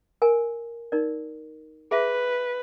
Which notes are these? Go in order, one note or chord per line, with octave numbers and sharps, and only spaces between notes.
A#4 G#5
D#4 A#4 D5
G#4 B4 E5